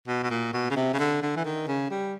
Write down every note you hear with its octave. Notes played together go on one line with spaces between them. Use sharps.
B2
B2
A#2
B2
C#3
C3
C#3
D3
D3
E3
D#3
C#3
G3